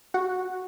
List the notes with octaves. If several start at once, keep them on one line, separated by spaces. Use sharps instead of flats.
F#4